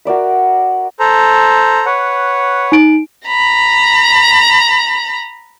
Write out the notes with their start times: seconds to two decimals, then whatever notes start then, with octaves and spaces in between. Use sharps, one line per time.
0.05 F#4 A#4 D5 E5
1.00 A4 C5 A#5
1.86 B4 C#5 F#5
2.72 D#4 D7
3.27 A#5 B5